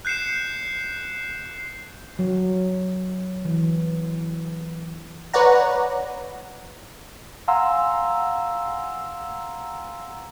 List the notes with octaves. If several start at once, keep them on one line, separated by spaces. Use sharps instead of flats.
F#6 G6 C7 C#7 E7
F#3
E3
B4 C#5 D5 F#5 A#5
F5 F#5 G#5 A#5 C6 E6